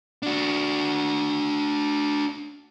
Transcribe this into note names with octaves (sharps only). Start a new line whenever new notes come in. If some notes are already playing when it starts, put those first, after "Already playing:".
D4 F#4